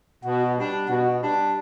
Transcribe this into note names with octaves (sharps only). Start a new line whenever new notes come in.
B2 F#4
G3 D4
B2 F#4
G3 D4